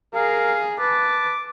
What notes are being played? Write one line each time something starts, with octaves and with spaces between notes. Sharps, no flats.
G#4 A#4 F5
B4 A5 D6